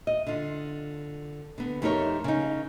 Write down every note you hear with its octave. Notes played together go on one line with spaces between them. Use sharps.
D#5
D3 F4
D3 B3
F2 A3 D#4 G4 A#4 C#5
C#3 D#4